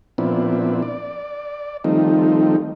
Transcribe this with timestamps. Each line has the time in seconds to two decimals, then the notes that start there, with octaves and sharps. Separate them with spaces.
0.18 A#2 F3 B3 C4 D4 E4
0.82 D5
1.84 D#3 F3 G3 A3 C4 D#4